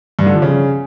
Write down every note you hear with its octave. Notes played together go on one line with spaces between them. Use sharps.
G2
D3
F3
C#3